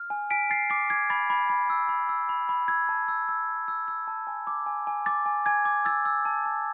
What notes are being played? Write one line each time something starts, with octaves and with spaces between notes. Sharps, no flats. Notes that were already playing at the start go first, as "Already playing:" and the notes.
Already playing: F6
G#5
G#5 B6 D7
G#5 A6 C7
D6 A6 C7
D6 G#6
B5 A6
B5
B5
E6
B5
E6
B5
B5
E6 G#6
A5
E6
E6
A5
E6
E6
A5
G#5
D6
G#5
G#5
D6 A6
G#5
G#5 G#6
D6
E6 A6
E6
A5
A5